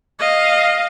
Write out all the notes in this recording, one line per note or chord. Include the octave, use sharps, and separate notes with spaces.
D#5 F5